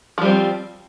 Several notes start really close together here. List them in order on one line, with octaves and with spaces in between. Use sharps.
F3 G3 C4